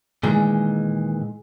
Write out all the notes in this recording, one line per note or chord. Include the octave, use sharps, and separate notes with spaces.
A#2 D#3 E3 G#3